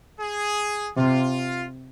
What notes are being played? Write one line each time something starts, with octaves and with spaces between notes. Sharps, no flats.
G#4
C3 F4